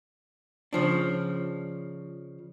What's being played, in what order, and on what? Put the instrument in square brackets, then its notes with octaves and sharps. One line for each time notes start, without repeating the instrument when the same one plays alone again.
[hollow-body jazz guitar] C#3 F3 D4